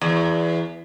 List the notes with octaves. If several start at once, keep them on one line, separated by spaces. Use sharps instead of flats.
E2